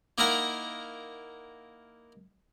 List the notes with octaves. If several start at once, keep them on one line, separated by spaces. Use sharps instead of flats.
A#3 D#4 E4 A#4 F#5 A#5